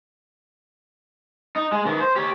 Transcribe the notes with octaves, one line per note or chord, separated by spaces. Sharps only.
D#4
G#3
D#3 E3
C5
G4 C#5